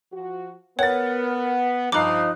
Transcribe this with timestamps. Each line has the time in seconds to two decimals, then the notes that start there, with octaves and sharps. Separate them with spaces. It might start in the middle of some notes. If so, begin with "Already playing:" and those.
0.13 F3 F#4
0.79 B3 A#4 C#5 F#5 A6
1.92 G2 F3 D#4 A#5 D6 F#6 C7